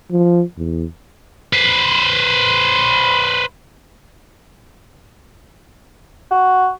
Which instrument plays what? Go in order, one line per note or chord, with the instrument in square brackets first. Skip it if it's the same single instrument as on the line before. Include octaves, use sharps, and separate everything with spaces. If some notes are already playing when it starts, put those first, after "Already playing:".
[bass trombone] F3
E2
[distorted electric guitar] B4 C5
[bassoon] F#4